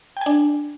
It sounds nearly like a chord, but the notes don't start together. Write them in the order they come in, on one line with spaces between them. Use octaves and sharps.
G5 G#5 D4